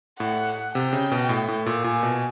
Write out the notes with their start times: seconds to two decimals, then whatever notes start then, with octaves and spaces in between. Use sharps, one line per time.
0.20 A2 F#5
0.75 C3 G5
0.93 C#3
1.11 B2
1.29 A2
1.48 A2
1.66 A#2
1.84 A#2 G#5
2.03 B2